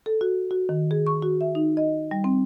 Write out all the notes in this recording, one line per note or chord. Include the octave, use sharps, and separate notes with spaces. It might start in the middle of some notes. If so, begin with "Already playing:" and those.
A4
F#4
F#4
D#3
G#4
C#6
F#4
E5
D#4
D#5
G3
C4